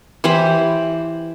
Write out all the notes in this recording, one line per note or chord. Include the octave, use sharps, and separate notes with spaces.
E3 G4 C5 B5